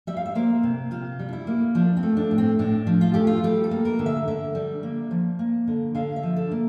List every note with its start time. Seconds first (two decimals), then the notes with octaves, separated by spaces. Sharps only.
0.07 G3 E5
0.17 F5
0.26 E5
0.35 A#3 C5
0.63 C3
0.91 C3 F4
1.19 G3
1.29 D4
1.33 E4
1.47 A#3
1.75 F3 D4
1.97 C4
2.03 A3
2.17 D4
2.31 A2
2.38 C4
2.59 A2 D4
2.87 F3
3.01 F4
3.14 A3 G4
3.27 F4
3.43 G3 G4
3.64 A4
3.71 A#3
3.85 A#4
3.99 D3
4.06 E5
4.28 D3 E5
4.55 G3
4.83 A#3
5.11 F3
5.39 A#3
5.67 D3
5.95 D3 F5
6.16 E5
6.23 F3
6.36 A4
6.51 A#3